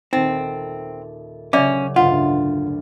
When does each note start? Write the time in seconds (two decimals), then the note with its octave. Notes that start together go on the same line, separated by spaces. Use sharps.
0.13 D#1 C4 D#4 A4
1.53 C#3 F#3 C#4 D5 E5 D6
1.96 A1 D2 G2 F4 F#5